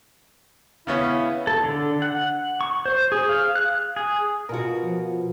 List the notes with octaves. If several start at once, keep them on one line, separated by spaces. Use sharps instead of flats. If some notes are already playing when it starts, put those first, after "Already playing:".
C#3 B3 C#4 E4
A4
D3
F#5
C#6
C5
G#4
F5
F#6
G#4
B2 F4 F#4 A#4
F3